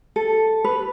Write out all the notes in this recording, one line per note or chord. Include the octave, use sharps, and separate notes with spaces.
A4
B4